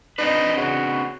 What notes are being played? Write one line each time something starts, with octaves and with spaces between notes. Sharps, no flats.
C4 D4 D#4 B4
C#3 F#4